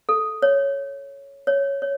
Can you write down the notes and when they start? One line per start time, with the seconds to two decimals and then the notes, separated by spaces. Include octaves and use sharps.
0.09 A4
0.42 C#5
1.47 C#5
1.82 C#5